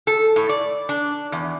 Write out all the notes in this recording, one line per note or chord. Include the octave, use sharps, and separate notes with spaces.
A4
A2
D5
D4
E2